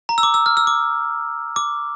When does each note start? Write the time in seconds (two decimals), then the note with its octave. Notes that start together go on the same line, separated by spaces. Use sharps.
0.09 A#5
0.18 E6
0.23 D6
0.34 E6
0.46 F6
0.57 E6
0.67 D6
1.56 D6